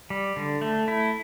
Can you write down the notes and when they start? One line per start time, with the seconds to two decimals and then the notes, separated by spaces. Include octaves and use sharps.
0.10 G3
0.36 D3
0.62 A3
0.88 E4